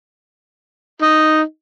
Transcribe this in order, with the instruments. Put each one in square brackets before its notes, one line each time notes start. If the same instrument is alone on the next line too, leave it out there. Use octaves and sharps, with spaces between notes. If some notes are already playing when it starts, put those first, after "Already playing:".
[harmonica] D#4